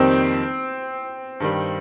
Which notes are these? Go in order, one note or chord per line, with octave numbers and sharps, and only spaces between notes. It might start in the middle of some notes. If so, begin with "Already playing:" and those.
Already playing: F2 D#3 G3 A#3 C4 D#4
G2 D#3 G3